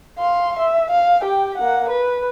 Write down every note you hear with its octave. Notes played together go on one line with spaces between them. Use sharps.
F5 C6
E5
F5
G4 G5
A#3 F#5
B4